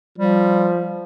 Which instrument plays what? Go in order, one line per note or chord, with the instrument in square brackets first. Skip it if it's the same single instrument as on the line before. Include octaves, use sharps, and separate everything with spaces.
[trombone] F3 [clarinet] G3